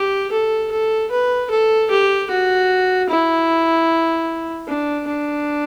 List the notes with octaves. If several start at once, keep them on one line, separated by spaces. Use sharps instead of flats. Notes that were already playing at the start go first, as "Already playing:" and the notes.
Already playing: G4
A4
A4
B4
A4
G4
F#4
E4
D4
D4